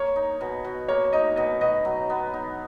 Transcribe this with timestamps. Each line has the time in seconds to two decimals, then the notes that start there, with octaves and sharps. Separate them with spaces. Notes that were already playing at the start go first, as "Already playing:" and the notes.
Already playing: A#3 C#5
0.16 D#4
0.41 B2
0.65 B2
0.88 A#3 C#5
1.13 D#4 D#5
1.36 B2 D#5
1.61 B2 D#5
1.85 F#3
2.10 B3
2.34 D#4